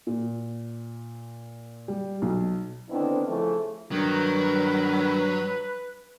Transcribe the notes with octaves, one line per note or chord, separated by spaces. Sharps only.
A#2
G3
B1
D3 D#3 B3 C4 D4 E4
C#3 E3 F3 A3
G2 D#3 F#3 B4